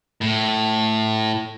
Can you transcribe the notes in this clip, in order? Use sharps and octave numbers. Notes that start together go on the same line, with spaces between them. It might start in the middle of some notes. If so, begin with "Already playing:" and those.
A2